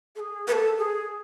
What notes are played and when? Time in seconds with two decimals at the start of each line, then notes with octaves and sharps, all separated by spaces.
0.16 A4
0.20 G#4
0.48 B4
0.52 A4
0.79 G#4